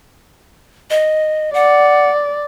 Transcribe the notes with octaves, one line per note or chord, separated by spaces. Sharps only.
D#5
D5 F#5